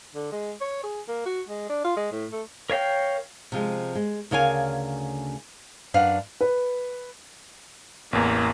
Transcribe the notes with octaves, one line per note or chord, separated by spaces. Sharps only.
D3
G#3
C#5
G#4
A#3
F#4
G#3
D4
F4
G#3
A2
A3
A#4 C#5 F5 G5
C3 F3 G#3
G#3
D2 C#3 A#4 C#5 F5 G#5
F#2 D4 B4 F5 F#5
B4
A1 E2 A#3